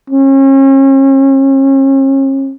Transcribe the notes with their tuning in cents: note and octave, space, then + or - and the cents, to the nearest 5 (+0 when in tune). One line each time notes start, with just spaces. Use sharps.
C#4 -40